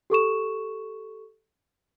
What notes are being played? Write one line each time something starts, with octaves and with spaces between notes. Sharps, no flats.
G4 A4 C#6 E7